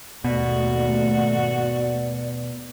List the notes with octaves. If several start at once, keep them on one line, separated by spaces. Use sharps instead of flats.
D#2 G#2 B2 A3 F#4 D5